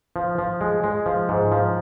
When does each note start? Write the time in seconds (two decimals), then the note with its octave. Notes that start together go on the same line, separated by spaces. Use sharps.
0.16 F3
0.38 F3
0.61 G#3
0.84 G#3
1.06 F3
1.29 G#2
1.52 F3